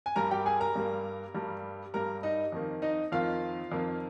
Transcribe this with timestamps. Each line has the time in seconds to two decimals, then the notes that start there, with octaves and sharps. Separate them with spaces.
0.06 G#5
0.16 G2 G3 A#3 A#4 A#5
0.31 G4 G5
0.46 G#4 G#5
0.60 A#4 A#5
0.76 G2 G3 A#3
1.35 G2 G3 A#3
1.94 G2 G3 A#3 A#4 A#5
2.23 D#4 D#5
2.52 F2 D#3 A#3
2.82 D#4 D#5
3.12 F2 D#3 A#3 F4 F5
3.71 F2 D#3 A#3